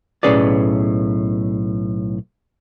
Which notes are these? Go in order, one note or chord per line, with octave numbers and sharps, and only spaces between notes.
B1 A2 C#4 G#4 B4 D5